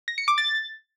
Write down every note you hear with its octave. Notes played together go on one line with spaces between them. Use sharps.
A#6
C#7
D6
A6